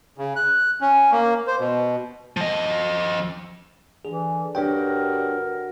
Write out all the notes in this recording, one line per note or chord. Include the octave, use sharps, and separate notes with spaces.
C#3
F#6
C#4
A#3
C5
B2
F3 D#5
D3 E3 G#4
G2 D4 F#4 A#4 C#5 G5